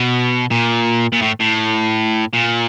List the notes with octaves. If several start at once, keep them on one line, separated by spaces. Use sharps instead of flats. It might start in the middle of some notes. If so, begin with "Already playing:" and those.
Already playing: B2
A#2
A#2
A2
A2
A#2